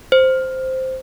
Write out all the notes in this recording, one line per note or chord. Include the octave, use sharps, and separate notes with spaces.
C5